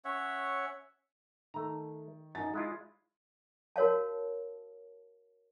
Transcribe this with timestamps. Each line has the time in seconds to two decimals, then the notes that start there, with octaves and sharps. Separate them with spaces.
0.05 C#4 C#5 E5 F#5
1.54 D#3 A3 A#5
2.35 F#2 D#4 A6
2.54 G#3 E4 F4
3.76 F#4 A#4 C#5 F5 A5